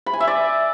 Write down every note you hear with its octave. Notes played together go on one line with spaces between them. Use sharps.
B5
G#5
E5
D5